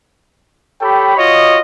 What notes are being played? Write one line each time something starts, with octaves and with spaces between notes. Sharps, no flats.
G4 A4 C#5 G5 B5
F4 F#4 C#5 D#5